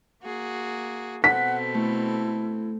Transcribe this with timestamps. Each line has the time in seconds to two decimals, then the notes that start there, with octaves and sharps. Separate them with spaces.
0.23 A#3 F#4 G#4
1.24 B2 C4 A4 F#5 B6
1.74 A3 E4